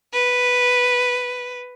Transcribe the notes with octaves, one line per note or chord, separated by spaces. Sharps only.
B4